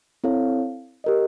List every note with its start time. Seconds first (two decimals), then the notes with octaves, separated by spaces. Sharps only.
0.24 C4 E4 A4 C#5 F5
1.04 G4 A#4 D#5